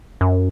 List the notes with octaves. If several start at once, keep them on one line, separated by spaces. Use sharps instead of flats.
F#2